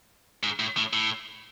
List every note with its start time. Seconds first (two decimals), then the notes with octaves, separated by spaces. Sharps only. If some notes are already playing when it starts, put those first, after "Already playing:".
0.43 G#2
0.60 A2
0.77 A2
0.93 A2